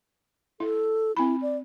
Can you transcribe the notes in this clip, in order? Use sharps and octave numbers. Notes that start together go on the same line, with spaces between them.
E4 A4
C4 E4 B5
D5